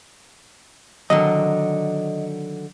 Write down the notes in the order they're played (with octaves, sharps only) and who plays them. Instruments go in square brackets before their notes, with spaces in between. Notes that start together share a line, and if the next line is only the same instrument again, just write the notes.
[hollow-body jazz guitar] D3 D#3 F#3 [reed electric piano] D#5